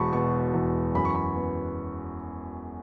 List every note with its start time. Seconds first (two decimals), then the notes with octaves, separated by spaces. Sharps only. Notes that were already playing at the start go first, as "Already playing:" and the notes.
Already playing: E1 E2 A5 B5 C#6
0.13 B2 C#6
0.54 E2
0.95 F#2 B5
1.05 C#6
1.15 B5
1.36 B3